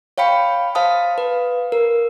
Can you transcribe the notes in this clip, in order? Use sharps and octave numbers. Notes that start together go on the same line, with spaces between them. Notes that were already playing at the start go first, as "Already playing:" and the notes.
C#5 F5 G5 B5 C#7
C5 F5 A5 D#6
B4
A#4